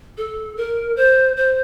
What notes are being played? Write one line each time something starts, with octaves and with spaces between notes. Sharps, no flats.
A4
A#4
C5
C5